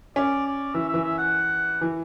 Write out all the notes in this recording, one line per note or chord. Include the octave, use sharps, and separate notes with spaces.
C#4 D5
D5
E3 E5
E5
E3
E5
F#5
E3